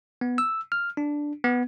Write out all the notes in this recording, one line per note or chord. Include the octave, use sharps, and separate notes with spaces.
B3
E6
F6
D4
B3